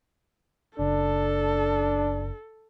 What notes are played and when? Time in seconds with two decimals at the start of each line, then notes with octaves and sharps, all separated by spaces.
0.79 F#1 C#3 D4 A4